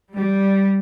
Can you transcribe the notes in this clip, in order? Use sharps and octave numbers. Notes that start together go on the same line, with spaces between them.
G3